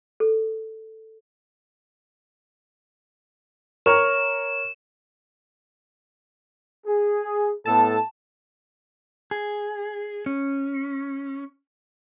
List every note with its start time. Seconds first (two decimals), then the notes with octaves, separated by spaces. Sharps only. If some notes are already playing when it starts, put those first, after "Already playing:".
0.20 A4
3.86 A#4 C#5 C#6 F6 E7
6.86 G#4
7.65 A2 B3 A4 A5
9.31 G#4
10.26 C#4